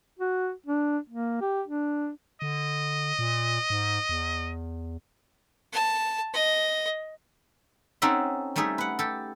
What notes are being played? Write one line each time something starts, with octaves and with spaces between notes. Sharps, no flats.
F#4
D4
A#3
G4
D4
D3 D#5
A#2
G#2
E2
A5
D#5
C4 C#4 D#4 F#4 A4 E5
G3 A3 D#4 G#4 E5
B4 F#5
G4 A4